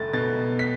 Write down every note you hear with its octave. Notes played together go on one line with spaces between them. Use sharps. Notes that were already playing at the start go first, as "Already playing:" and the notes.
Already playing: F#1 A3 A6
B2 A6
B6